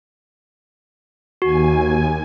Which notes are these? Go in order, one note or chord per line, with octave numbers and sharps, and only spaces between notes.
D#2 F#4 G#5